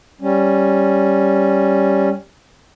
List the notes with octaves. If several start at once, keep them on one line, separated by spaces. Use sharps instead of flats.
G3 C#4